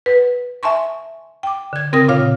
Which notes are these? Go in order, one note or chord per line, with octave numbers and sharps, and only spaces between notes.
B4
E5 G#5 A5 C6 C#6
G5 D6
D3 G#6
C#3 C4 A#4 G5 D#6 A#6
A#2 F4 C#5 F5 F6